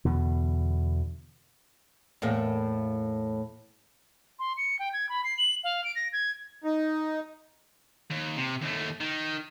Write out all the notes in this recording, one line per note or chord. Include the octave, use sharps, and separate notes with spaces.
E2 B2 D3
E2 A2 A#3
C6
C#7
G5
G#6
B5
C7
F#7
F5
D7
A#6
G#6
D#4
D#2
C3
D#2 A3
D#3